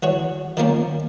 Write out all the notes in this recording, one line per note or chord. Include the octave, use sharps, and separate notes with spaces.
E3 F#4 C#5
D#3 F3 A#3 C#4